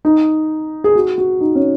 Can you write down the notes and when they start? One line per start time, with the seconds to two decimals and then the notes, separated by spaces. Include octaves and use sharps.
0.05 D#4
0.84 G#4
0.95 F#4
1.18 F#4
1.41 D#4
1.55 C#4